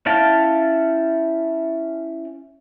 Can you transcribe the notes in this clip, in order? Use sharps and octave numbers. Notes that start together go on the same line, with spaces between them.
C#4 E4 F5 G5 A5